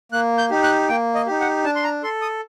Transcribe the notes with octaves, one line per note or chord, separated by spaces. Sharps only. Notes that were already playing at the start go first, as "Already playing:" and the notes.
A#3 F#6
G6
D#4 G4
F#6
A#3 G5
D#5
D#4 G4
F#5
D4 A5
C6
A#5
A4 C6
D#6